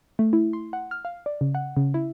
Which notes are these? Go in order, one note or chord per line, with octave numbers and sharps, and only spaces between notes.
A3
E4
C6
F#5
F6
F5
D5
C#3
F#5
C#3
E4